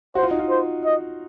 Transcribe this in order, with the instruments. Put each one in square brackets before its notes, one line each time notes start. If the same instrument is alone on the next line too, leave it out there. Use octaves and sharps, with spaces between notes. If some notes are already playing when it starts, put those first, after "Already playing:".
[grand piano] F#4 [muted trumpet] C5
[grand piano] F4
D#4
F4
[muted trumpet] C5
D#5